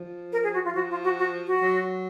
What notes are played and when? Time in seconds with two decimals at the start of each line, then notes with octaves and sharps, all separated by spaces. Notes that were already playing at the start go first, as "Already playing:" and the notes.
Already playing: F3
0.32 A#4
0.43 G#4
0.54 F#4
0.65 F4
0.75 F3 F#4
0.91 F4
1.04 F#4
1.19 F#4
1.47 F#4
1.62 F#3